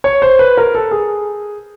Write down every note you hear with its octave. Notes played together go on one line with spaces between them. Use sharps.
C#5
C5
B4
A#4
A4
G#4